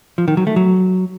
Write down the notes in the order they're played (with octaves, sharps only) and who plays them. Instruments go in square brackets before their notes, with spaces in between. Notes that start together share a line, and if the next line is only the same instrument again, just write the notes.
[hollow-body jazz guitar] F3
D#3
F#3
A3
F#3